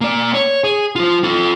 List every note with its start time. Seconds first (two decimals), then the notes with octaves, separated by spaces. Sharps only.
0.01 A#3 D5
0.34 C#5
0.64 G#4
0.96 F4 C5
1.24 F4 A4